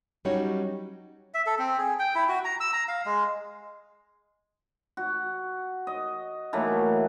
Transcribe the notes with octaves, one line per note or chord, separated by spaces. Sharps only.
F#3 G3 C#4 D#4 F#4 C#5
E5
A4
C4
G#4
G5
E4
F#4
A#5
E6
A#5
F5
G#3
F#4
D#5
E3 F#3 A3 A#3